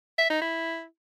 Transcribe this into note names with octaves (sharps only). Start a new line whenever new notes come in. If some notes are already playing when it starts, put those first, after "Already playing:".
E5
D#4
E4